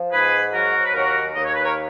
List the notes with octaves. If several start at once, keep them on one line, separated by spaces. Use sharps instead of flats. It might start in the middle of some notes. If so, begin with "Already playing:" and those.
Already playing: F3
G#2 G#4 B4
F#3 F#4 A#4
B4
D#2 F#4 A#4
D#2 D#5
C#5
B4
A#4 C#5